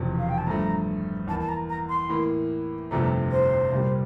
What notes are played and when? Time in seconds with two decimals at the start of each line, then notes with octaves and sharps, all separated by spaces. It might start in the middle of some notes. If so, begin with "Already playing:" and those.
Already playing: E1 E2 C3 F3
0.18 F5
0.29 G5
0.38 A5
0.47 G2 F3 A3 A#5
1.27 E2 E3 A#3 A5
1.40 A5
1.48 A#5
1.69 A#5
1.89 C6
2.09 A2 E3 A#3
2.91 G1 F2 C3 F3 A3 A#5
3.31 C5
3.71 C2 A#2 G3